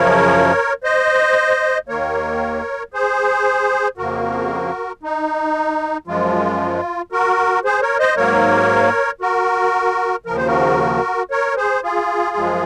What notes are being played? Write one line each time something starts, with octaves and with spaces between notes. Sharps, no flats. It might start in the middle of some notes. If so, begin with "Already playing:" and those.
Already playing: F#2 C#3 F3 A#4 C#5
C5 D#5
D#2 D#3 A#3 A#4 C#5
G#4 C5
F2 C#3 F3 A#3 F#4 A#4
D#4
F#2 F3 G#3 F4
F#4 A#4
G#4 C5
A#4 C#5
C5 D#5
G#2 F#3 A#3 A#4 C#5
F#4 A#4
D#2 C#3 F3 A#4
C5
F#4 A#4
A#4 C#5
G#4 C5
F4 G#4
F#2 F3 G#3